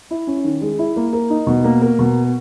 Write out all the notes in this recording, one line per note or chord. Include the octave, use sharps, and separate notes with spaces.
E4
C#4
D#3
G#3
E4
A#3
A#4
D#4
B2
A#3
A#4
B2